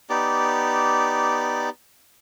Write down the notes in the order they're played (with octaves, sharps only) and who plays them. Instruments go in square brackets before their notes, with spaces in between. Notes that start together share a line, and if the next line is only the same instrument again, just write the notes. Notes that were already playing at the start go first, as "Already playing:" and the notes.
[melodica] B3 D#4 G4 D5